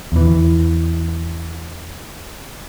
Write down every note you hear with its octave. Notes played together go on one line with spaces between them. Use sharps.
E2 E3